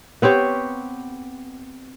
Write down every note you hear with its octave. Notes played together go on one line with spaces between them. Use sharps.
B3 C4 G4 C#5